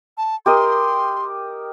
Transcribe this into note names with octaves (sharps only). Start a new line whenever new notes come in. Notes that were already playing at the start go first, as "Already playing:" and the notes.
A5
G4 A#4 D#5 C6